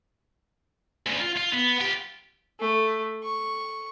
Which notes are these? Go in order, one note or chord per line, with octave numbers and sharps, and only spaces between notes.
D2 C#3
F4
F4
B3
F4 G4
A3
C#6